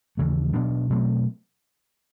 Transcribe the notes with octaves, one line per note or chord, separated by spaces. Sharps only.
D#2 C#3 E3 A3
B2 F#3 B3 D4
B2 F#3 A3 C4